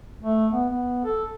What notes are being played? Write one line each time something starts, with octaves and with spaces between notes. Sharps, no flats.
A3
B3
B3
A4